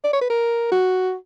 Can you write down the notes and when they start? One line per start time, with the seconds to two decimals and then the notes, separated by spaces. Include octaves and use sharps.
0.04 D5
0.13 C#5
0.21 B4
0.30 A#4
0.72 F#4